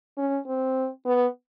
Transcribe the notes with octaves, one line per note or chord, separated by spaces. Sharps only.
C#4
C4
B3